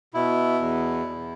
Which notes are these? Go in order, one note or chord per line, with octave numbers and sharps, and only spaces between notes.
B2 E4
E2
E2